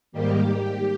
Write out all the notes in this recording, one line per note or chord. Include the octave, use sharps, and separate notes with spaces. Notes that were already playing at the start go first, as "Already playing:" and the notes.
G#2 D#3 G3 A#3 G4